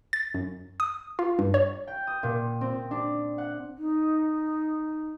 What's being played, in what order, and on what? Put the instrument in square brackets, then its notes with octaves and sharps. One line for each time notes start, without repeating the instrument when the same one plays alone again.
[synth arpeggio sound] A6
F#2
D#6
F4
G2
C#5
[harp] G5
D#6
A#2
C4
D4
F#5
[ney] D#4